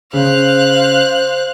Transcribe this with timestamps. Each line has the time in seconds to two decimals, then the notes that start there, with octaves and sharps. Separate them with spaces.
0.13 C#3 C5 F5 F#6